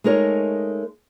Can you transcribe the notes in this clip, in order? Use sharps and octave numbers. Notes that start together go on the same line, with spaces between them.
G#3 A3 D#4 G#4 A#4 C#5